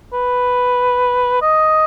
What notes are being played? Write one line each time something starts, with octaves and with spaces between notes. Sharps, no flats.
B4
D#5